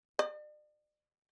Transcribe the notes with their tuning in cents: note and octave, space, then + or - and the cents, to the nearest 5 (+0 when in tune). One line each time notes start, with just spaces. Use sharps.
D5 +40